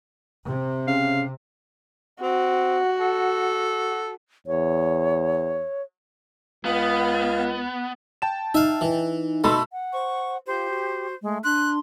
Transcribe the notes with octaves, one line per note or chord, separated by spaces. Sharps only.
C3
C#3 F5
C4 F#4
A4
E2 C#5
C#2 B3 F5
G5 A5 E7
D#4 E5 F5
E3
B2 A3 A4 D#5 B5 C6 E6
F#5
C5 C#6
F4 G4 C5
F#4
G#3 A3
D4 C6 F#6